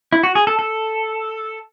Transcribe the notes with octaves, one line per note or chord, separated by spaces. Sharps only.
E4
F#4
G#4
A4
A4